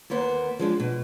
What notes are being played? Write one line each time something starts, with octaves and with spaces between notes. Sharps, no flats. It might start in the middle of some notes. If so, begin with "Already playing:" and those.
D#2 A#3 B3 C5
F3 G#3 D4
B2